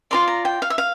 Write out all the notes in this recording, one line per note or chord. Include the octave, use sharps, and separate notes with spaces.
F4 A#4 D5 C6
A#5
G5
F5
E5
F5